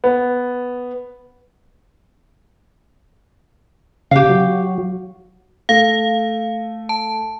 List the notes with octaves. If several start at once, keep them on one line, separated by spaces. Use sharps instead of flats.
B3
C#3 G4 F5
F#3
A3 F5
A5